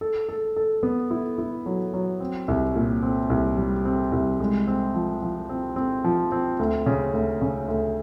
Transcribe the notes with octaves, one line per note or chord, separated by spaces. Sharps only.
A4
A4
A4
B3
E4
E4
F#3
F#3
C4
C2
A#2
C4
C2
G3
C4
C2
G#3
C4
F3
F3
C4
C4
F3
C4
D2
C#3
D2
C#3
D2